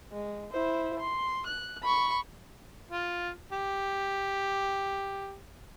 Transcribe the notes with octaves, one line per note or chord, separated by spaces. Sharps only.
G#3
E4 C5
C6
F#6
B5 C#6
F4
G4